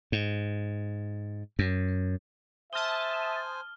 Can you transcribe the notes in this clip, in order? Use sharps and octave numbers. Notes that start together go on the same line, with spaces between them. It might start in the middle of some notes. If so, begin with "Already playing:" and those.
G#2
F#2
C5 E5 G#5 A5 D#6 F6 G7